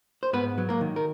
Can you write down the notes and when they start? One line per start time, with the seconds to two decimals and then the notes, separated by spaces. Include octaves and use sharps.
0.23 C5
0.33 G#2 B3 B4
0.58 F#3
0.69 A#3 A#4
0.81 D#3
0.96 A#4